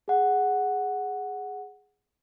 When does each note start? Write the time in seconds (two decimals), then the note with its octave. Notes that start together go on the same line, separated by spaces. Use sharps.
0.08 G#4 F#5